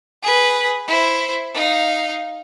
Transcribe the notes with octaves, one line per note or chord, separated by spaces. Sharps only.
G#4 B4
E4 C5
D#4 F5